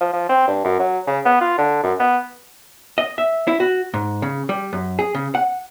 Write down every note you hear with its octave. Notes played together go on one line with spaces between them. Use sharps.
F3
F3
C4
G2
F#2
F#3
C#3
B3
F4
D3
F#2
B3
D#5
E5
E4
F#4
G#2
C#3
G3
F#2
G#4
C#3
F#5